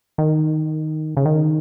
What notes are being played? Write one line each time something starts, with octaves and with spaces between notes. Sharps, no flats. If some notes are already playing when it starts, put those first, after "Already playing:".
D#3
C#3
D#3